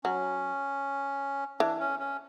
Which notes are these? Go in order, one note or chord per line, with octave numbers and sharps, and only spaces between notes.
F#3 C#4
E3 D4
C#4
C#4